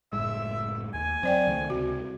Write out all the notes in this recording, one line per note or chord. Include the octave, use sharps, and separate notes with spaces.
F#1 A2 G#3 E5
D#2 G#5
F#3 C4 C5 D5 G5
C#2 D#3 A3
C#2 C3 F#4